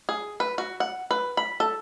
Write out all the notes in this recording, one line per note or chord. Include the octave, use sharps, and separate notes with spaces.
G#4
B4
F#4
F#5
B4
B5
A4